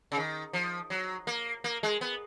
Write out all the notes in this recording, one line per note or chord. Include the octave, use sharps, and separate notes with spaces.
C#3
D#3
F3
F#3
A#3
A#3
G#3
B3